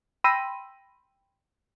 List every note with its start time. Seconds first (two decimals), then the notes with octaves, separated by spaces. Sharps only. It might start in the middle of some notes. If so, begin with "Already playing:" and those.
0.24 G5 B5 C6 E6 A#6 D#7